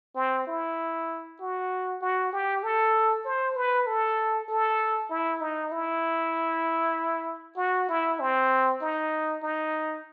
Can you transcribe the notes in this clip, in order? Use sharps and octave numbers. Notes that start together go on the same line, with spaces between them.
C4
E4
F#4
F#4
G4
A4
C5
B4
A4
A4
E4
D#4
E4
F#4
E4
C4
D#4
D#4